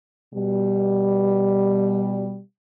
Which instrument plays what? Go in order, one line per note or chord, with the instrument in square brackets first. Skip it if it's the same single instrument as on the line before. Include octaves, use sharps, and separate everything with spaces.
[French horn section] B2 G3